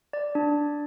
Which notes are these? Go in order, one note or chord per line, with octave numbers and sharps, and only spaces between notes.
D5
D4